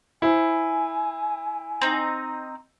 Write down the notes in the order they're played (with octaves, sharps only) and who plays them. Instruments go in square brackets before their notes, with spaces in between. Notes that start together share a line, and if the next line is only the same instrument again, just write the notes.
[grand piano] E4 C5 [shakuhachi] G#5
[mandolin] C4 D#4